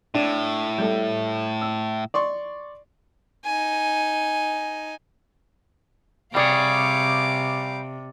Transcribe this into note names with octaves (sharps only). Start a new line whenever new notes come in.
A2 D4
G3 A3
E6
D5 C6 C#6
D#4 G#5
C3 G3 G#4 C#5 D5 F5 G5 D6